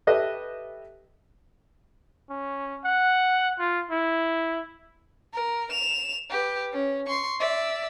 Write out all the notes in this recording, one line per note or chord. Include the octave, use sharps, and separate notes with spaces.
G4 A4 B4 D#5 E5
C#4
F#5
F4
E4
A#4
E7 F7
G4 B4
C#4
C6 C#6
D5 E5